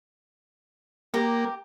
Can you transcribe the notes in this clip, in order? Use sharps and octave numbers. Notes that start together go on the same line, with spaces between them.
A#3 G4 A#5